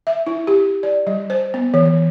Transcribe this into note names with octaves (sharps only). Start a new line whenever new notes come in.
E5
E4
G4
D5
G3
C5
B3
E3
E3